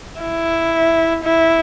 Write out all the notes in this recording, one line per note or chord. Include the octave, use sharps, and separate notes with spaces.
E4
E4